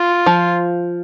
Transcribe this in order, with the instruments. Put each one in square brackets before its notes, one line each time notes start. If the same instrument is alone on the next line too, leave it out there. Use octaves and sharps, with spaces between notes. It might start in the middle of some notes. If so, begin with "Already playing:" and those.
Already playing: [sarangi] F4
[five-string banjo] F3